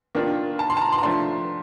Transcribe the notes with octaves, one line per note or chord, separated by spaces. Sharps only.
D#3 A#3 D4 F4
A5
C6
A5
A#5
C6
A#5
F3 A3 D4 C6